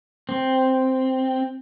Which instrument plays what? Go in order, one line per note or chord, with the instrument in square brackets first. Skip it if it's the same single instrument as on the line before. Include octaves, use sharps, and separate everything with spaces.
[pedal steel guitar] C4